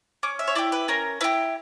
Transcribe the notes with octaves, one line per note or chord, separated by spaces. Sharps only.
C#4 D6
E5
C#5
E4 G4 D5
B4
C#4 A#4
E4 G4 B4